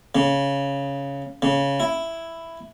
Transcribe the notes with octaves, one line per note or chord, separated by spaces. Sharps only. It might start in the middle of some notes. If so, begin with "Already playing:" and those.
C#3
C#3
E4